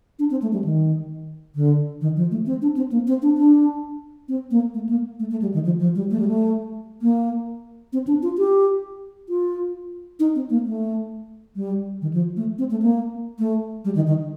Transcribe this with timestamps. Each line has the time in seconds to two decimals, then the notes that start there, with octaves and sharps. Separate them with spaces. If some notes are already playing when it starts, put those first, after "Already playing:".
0.19 D4
0.31 C4
0.42 A3
0.53 G3
0.64 D#3
1.55 D3
2.01 D#3
2.16 F3
2.31 A3
2.46 C4
2.62 D4
2.77 C4
2.92 A#3
3.07 C4
3.22 D4
3.38 D4
4.29 C4
4.51 A#3
4.74 A3
4.89 A#3
5.19 A3
5.31 A3
5.42 G3
5.54 D#3
5.65 F3
5.80 F3
5.95 G3
6.11 A3
6.20 G3
6.28 A3
7.02 A#3
7.93 C4
8.07 D4
8.23 F4
8.38 G4
9.29 F4
10.20 D#4
10.35 C4
10.50 A#3
10.66 A3
11.56 G3
12.02 D#3
12.14 F3
12.37 A3
12.58 C4
12.71 A3
12.82 A#3
13.39 A3
13.85 G3
13.95 D#3
14.07 D#3